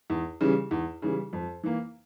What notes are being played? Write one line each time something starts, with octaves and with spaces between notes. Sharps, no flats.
E2
C#3 E3 G3
E2
C#3 E3 G3
F2
E3 A#3